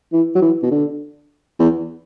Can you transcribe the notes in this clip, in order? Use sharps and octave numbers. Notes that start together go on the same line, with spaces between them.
E3
F#3
E3
B2
D3
E2